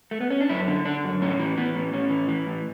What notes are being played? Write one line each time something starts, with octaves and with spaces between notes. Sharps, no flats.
A3
B3
C#4
D4
F#2 E4
D3
D3 D4
F#2
A2 C#4
E3
E3 B3
A2
A2 C#4
E3
E3
A2